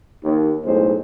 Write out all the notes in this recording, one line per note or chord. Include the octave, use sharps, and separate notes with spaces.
D#2
B1 A2 G#3 C5